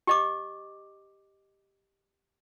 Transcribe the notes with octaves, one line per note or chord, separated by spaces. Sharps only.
G4 D#5 D6